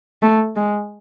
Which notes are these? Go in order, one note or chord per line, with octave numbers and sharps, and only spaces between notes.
A3
G#3